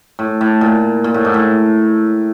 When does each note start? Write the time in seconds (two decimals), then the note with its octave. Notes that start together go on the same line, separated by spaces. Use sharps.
0.19 A2
0.41 A2
0.61 A#2
1.04 A#2
1.14 A2
1.25 G#2
1.34 A2